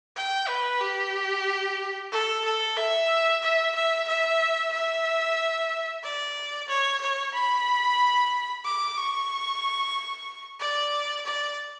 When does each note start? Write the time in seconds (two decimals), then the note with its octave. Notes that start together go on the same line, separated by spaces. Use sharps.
0.16 G5
0.48 B4
0.81 G4
2.12 A4
2.45 A4
2.77 E5
3.43 E5
3.75 E5
4.08 E5
4.72 E5
6.03 D5
6.68 C#5
7.01 C#5
7.34 B5
8.65 D6
8.98 C#6
10.60 D5
11.26 D5